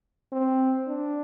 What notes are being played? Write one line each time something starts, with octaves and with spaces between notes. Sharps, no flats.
C4
D4